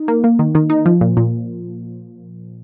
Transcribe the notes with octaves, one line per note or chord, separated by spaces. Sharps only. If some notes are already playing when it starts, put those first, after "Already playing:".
Already playing: D#4
A#3
A#3
D#3
D#3
D#4
F3
A#2
A#2